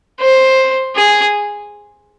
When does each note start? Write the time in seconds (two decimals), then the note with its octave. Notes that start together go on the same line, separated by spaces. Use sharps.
0.20 C5
0.96 G#4